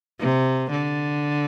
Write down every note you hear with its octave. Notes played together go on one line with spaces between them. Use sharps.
C3
D3